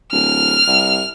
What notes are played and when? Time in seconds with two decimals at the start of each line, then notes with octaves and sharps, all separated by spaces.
0.12 D1 F6
0.67 C2